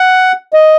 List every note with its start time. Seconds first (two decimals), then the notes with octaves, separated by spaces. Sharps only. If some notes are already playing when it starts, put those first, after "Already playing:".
Already playing: F#5
0.53 D#5